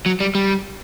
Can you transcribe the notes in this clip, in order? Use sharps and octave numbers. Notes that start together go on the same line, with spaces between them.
F#3
G3
G3